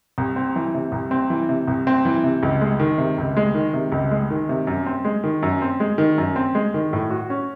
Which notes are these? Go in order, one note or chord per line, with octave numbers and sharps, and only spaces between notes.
C2
C4
E3
C3
C2
C4
E3
C3
C2
C4
E3
C3
C#2
G#3
D#3
C3
C#2
G#3
D#3
C3
C#2
G#3
D#3
C3
F#2
C4
G#3
D#3
F#2
C4
G#3
D#3
F#2
C4
G#3
D#3
A2
F#4
C#4